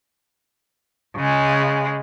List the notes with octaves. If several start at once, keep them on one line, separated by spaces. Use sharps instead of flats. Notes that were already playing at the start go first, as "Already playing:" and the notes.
C#3 G#3